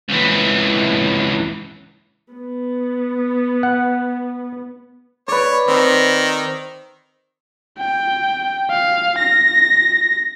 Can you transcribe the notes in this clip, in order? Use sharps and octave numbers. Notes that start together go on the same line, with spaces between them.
C#2 E3
B3
F#5
B4 C#5 D5
D#3 C4
G5
F5
A#6